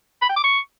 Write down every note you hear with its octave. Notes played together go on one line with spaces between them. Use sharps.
B5
G5
D6
C#6